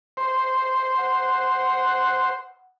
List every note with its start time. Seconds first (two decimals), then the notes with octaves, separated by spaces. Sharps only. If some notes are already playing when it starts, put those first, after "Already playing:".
0.17 C5
0.99 F#5